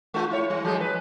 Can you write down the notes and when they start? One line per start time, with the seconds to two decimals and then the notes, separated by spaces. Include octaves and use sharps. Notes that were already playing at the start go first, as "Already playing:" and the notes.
0.14 G#3 F4
0.31 E4 C#5
0.50 G3
0.65 F3 G#3 G#4
0.81 B4